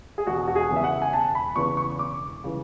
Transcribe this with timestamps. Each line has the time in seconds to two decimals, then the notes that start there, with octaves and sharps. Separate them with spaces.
0.18 G#4
0.27 E1 F#4
0.48 F#4
0.56 G#4
0.70 E2 C#3 E3
0.76 E5
0.84 F#5
1.02 G#5
1.13 E1 A5
1.35 B5
1.56 E2 C#3 E3 C#6
1.77 C#6
1.99 E1 D6
2.44 C#3 E3